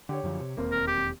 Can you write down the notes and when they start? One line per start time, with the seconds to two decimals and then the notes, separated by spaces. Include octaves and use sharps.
0.09 D3 G4 C#5
0.23 F#2 D3 F3
0.40 C3
0.57 E1 D#2 A#3 C4
0.71 A#4
0.87 G4